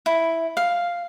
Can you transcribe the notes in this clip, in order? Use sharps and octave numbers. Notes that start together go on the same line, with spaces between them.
E4
F5